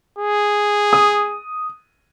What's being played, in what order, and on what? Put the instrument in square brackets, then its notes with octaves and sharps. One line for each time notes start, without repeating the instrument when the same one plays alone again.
[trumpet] G#4
[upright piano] D#6